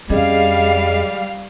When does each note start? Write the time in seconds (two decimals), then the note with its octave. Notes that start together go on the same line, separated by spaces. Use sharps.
0.10 F2 G3 C#4 G#4 D#5 F5